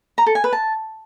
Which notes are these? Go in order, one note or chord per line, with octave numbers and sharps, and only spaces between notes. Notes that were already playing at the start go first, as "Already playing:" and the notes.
A#5
A4
G#5
B4
A5